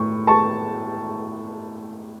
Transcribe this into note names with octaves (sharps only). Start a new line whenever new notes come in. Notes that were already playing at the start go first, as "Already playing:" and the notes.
Already playing: A2 C#6
A5 C#6